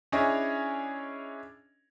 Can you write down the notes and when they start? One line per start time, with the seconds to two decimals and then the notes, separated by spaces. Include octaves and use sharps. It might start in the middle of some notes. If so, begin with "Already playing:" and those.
0.12 C#4 D4 E4 G#4 C#5 D#5